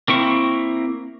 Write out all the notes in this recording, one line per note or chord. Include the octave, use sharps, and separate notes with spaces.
A#3 C4 E4 C#6